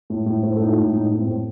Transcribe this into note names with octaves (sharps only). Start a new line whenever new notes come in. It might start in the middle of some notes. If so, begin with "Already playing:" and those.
A2
A2
A2 C5
A4
A2 D#4
F4
A2 D#4
A2 D#4
A2
C4
A2